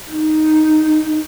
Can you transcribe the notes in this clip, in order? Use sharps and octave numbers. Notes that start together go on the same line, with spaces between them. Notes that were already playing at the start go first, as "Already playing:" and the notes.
D#4